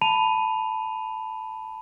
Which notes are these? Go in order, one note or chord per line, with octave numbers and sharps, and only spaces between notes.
A5 B5 D#7 F7